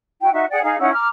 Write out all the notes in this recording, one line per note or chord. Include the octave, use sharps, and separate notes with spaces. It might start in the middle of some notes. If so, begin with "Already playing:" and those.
E4 F#4 G5
D#4 F#4 E5
G#4 D5 F#5 G5
D#4 G#4 F5
C#4 D#4 E4 F#5
A#5 D6 F6